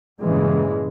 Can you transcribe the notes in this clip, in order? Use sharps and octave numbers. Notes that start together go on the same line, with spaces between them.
G2 A#2 C#3 E3 G#3